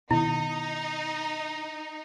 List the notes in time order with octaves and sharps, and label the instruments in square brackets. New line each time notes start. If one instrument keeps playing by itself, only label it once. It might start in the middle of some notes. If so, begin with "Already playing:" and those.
[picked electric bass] B2 D#3 [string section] D#4 [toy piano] E4